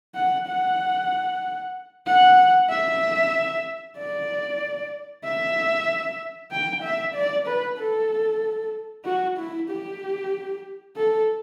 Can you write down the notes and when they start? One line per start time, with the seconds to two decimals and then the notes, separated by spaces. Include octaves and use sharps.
0.15 F#5
0.47 F#5
2.06 F#5
2.70 E5
3.97 D5
5.24 E5
6.51 G5
6.83 E5
7.15 D5
7.47 B4
7.78 A4
9.05 F#4
9.37 E4
9.69 G4
10.97 A4